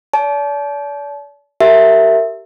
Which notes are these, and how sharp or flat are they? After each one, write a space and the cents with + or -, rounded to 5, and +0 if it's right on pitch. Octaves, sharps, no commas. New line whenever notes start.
D5 -40 A5 -35
G4 -20 A#4 -25 E5 +0